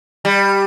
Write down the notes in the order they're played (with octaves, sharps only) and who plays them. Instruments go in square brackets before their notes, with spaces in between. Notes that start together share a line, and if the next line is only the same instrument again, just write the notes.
[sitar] G3